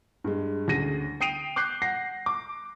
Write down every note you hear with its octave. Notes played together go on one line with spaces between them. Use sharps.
G2 G#3
D2 C#3 G#4 A#6 D#7
G5 D#6 C7 D7 D#7 F7
D6 F#6 G6 C7
F#5 A#6 C7
D6